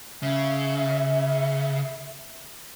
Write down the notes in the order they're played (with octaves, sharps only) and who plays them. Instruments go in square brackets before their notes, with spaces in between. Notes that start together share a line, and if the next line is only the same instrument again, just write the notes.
[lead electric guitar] C#3 [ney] E5